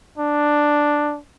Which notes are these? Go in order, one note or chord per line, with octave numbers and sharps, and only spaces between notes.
D4